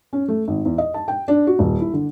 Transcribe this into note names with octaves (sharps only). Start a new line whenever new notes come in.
C#4
A3
G#1
E2
D#5
A5
G5
D4
F#4
D#1
E4
D3